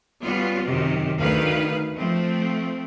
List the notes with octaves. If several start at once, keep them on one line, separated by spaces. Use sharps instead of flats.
G3 B3 C#4 F4 F#4
F#2 C3 D#3 G4
D2 D#3 D#4 B4 F5
F3 A3 C4